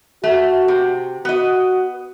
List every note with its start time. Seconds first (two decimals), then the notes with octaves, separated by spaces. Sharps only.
0.24 A3 F#4
0.68 C3
1.25 B3 F#4 D#5